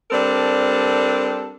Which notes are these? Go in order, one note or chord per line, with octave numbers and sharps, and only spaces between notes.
G3 C4 D4 A4 A#4